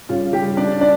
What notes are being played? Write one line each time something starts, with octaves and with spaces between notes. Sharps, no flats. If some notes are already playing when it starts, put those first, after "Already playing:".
C#3 G3 C#4 F4
G3 G4
D4 D5
D4 D5